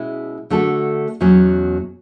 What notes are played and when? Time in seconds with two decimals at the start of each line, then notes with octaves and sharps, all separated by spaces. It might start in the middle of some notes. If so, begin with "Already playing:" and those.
Already playing: B2 G#3 C#4 E4
0.50 D3 A3 D4 F#4 A4
1.21 E2 B2 F#3 C#4